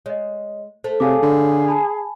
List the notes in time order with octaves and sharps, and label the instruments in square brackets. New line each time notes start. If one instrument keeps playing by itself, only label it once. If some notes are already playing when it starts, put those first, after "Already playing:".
[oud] G#3 [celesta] C#5 D#5
[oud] A3 A4 [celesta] C5
[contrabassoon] C3 [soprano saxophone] G#4 [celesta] C#5 F5 D6
[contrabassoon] D3
[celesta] G#5 A5 B5